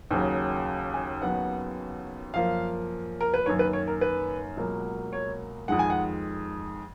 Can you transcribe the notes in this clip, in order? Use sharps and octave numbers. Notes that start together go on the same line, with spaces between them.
D#2 C#3 F#3
G#5
D#2 C#3 F#3 B3 F#5
F#2 F3 A#3 F5
A#4
B4
F#2 D#3 A#3 C#5
B4
C#5
A#4
B4
C#2 B2 F#3 A#3
C#5
F2 D#3 G#3 F#5
G#5
F#5